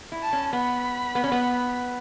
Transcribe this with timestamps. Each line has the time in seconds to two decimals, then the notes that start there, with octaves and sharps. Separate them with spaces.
0.12 E4
0.22 A5
0.33 C#4
0.53 B3 B5
1.15 B3
1.24 C#4
1.32 B3